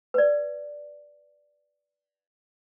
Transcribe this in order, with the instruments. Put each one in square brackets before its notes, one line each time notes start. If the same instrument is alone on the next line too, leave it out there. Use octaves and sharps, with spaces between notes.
[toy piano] B4 D5